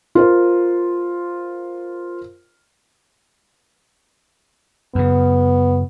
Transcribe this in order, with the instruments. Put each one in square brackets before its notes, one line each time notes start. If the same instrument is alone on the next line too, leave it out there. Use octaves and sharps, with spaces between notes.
[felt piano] F4 A#4 C5
[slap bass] F#2 C#3 [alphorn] B3